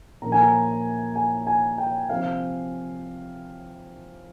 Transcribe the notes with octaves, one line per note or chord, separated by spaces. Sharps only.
A#2 F3 A#3 C#4 A#5
G#5
A#5
G#5
G#5
G5
C3 F3 C4 F5